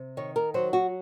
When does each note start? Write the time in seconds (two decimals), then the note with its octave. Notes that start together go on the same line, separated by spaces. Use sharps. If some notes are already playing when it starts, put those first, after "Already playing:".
Already playing: C3
0.17 D#3 C#5
0.36 A#4
0.54 F#3 C5
0.73 F#4